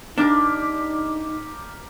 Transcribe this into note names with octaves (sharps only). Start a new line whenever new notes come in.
A#3 D4 D#4 G4 A#4